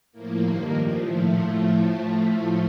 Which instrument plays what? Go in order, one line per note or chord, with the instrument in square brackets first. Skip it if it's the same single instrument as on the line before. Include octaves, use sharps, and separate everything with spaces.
[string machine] A2 F3 A#3
G2 D#3
A#2 F3
A2 F3 A3